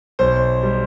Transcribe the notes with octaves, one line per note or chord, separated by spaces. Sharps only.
B1 C5
G3